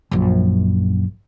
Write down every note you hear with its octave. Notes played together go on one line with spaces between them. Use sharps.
A#1 F#2